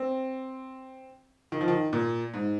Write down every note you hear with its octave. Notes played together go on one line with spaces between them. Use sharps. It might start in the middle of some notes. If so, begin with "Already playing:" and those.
Already playing: C4
D#3
F3
D#3
A#2
G#2